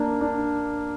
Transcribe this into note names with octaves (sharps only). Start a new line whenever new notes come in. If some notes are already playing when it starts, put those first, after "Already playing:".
Already playing: A#3 D4
D4